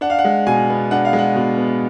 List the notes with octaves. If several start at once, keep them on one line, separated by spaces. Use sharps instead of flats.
D4 F#5
F5
F#5
G#3
B2 G#5
B3
D4 F#5
F5
G#3
F#5
B2
B3